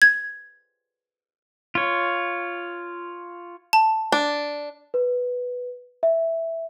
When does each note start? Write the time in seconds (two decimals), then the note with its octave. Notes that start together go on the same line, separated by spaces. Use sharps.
0.02 G#6
1.75 F4 C#5
3.73 A5
4.12 D4
4.94 B4
6.03 E5